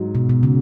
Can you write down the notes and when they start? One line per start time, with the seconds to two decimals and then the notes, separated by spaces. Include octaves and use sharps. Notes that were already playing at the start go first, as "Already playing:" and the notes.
Already playing: G#2 F#3
0.15 B2
0.29 B2
0.43 C#3